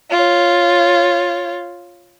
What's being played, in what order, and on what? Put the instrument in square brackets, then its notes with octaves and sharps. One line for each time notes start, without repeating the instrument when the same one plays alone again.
[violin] F4 C#5